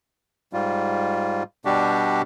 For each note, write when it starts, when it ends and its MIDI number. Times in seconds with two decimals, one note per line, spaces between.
0.53 1.43 44
0.53 1.43 55
0.53 1.43 65
1.65 2.22 47
1.65 2.22 55
1.65 2.22 62
1.65 2.22 66
1.65 2.22 67